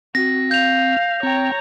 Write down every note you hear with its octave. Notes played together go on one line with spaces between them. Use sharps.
C4 F#4 A#6
F5 G6 F7
C4 C#5 G5 A#5